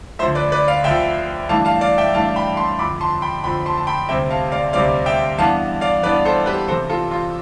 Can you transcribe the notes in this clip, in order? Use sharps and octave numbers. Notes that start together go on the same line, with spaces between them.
D2 D3 F3 C5 E5
B4 D5
B4 D5
D5 F5
D2 D3 F3 E5 G5
G2 E3 A3 D4 F5 A5
F5 A5
D5 F5
E5 G5
G2 E3 A3 D4 F5 A5
G5 B5
A5 C6
F2 D3 F3 B5 D6
A5 C6
G5 B5
F2 D3 F3 G5 B5
A5 C6
A5
G5 B5
D2 C3 G3 C4 E5 G5
F5 A5
D5 F5
D2 C3 G3 C4 D5 F5
E5 G5
G2 E3 B3 D4 F5 A5
D5 F5
G2 E3 B3 D4 B4 D5
A4 C5
G4 B4
E2 C3 G3 A4 C5
F4 A4
F4